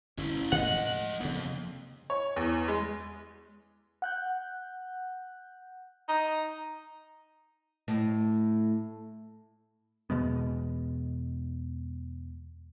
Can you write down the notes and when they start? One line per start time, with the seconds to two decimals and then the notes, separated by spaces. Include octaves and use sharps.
0.18 G1 F2 B2 C#4 E4
0.52 A2 F3 G#3 A3 D#5 F#5
1.20 F2 C3 A#3 B3
2.10 C#5
2.36 E2
2.68 G#3
4.02 F#5 F#6 G6
6.09 D#4
7.88 A2
10.10 E2 B2 G#3 B3